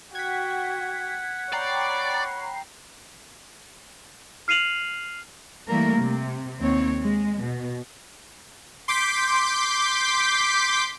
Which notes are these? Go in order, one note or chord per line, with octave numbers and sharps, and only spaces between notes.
F#4 F#5 G5 G#6 B6
C#5 D5 G5 A#5 B5 C7
F6 C7 D#7 F7 F#7
E3 G3 A3 A#3 A#4
C3
D#2 C4 C#5
G#3
B2
C6 D6 G6 B6